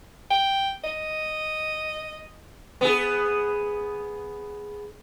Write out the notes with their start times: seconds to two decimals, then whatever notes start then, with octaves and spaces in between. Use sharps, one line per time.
0.30 G5
0.84 D#5
2.81 B3 G#4